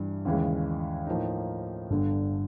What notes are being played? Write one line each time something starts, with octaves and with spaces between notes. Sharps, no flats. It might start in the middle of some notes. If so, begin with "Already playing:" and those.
Already playing: G2 E3 G3
D#2 C#3 E3 G#3
A2 F3 A#3 D#4
G1 G2 D3